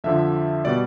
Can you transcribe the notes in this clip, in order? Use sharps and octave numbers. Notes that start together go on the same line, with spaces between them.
F2 D3 F3 E5
B2 G3 D5